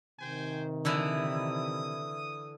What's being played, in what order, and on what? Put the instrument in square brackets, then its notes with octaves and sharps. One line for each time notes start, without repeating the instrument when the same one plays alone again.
[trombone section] C3 D#3 [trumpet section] C5 G5 G#5
[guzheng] D3 E3 E4 [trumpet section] D#6